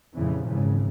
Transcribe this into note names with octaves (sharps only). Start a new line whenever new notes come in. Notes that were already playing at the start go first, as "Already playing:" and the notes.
F1 A#2 C#3 E3 F3
G#1 C#3 E3